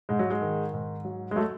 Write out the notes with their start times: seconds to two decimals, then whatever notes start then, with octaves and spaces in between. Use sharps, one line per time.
0.09 G#2 G#3
0.19 F#3
0.30 G#3
0.41 D#3
0.74 G#2
1.05 F#3
1.31 G#3
1.36 F#3 A3